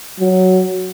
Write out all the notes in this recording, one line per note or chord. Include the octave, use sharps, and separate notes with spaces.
F#3